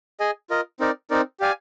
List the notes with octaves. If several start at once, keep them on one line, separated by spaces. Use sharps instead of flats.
G#4 D#5 G#5
F4 A#4 D#5
C4 D#4 A#4 D5
C4 D#4 A#4 D5
G4 D5 F5 G#5